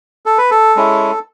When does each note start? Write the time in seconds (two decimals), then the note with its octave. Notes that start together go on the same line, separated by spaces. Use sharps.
0.26 A4
0.38 B4
0.51 A4
0.76 G#3 C#4 E4